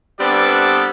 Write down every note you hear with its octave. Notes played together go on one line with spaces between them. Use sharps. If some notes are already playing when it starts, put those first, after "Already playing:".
G3 B3 C4 D4 A4 D5